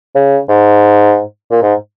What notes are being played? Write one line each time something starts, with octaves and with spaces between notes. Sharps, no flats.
C#3
G#2
A#2
G#2